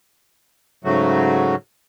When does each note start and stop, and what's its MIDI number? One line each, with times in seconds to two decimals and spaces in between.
0.84 1.55 44
0.84 1.55 49
0.84 1.55 54
0.84 1.55 57
0.84 1.55 66